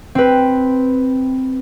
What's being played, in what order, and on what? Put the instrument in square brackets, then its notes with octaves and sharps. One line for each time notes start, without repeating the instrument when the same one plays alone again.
[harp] C4 B4